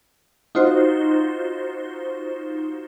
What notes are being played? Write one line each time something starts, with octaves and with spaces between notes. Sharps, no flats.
D#4 F4 F#4 C5